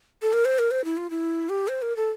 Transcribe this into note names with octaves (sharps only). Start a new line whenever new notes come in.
A4
A#4
C5
A#4
C5
E4
F4
E4
G4
C5
A#4
A4